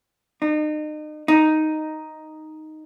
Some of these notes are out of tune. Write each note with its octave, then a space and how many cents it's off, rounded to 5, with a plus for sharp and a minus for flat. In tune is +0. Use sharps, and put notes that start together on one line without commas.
D#4 -35
D#4 +0